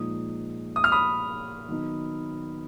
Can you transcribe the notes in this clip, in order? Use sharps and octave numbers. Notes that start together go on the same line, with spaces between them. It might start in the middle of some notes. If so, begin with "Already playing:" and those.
Already playing: A#2 F3 G#3 D#4 D#6
D#6
F6
B5 D#6
D#3 F#3 B3 D#4